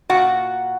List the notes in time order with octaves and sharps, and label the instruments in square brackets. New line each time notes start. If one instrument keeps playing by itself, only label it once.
[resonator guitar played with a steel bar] A#2 F#4 F#5